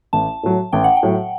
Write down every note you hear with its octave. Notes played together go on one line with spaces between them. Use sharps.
A1 A5
A2 F#3
A1 G5
F#5
G5
A2 F#3